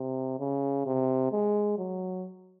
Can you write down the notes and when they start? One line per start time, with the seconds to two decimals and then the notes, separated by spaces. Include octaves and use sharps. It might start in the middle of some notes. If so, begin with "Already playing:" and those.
Already playing: C3
0.40 C#3
0.86 C3
1.32 G#3
1.78 F#3